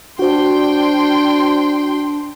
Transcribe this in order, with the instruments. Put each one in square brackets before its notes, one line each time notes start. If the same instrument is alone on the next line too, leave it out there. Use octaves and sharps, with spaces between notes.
[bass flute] D4 [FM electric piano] F#4 C5 [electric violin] G5 C6